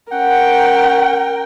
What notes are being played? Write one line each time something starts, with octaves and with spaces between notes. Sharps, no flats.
C#4 A#4 F#5 G5